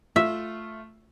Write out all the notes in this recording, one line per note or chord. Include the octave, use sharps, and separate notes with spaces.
A3 F4 E5